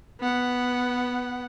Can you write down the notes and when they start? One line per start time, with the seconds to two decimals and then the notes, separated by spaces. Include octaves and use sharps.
0.20 B3 F#5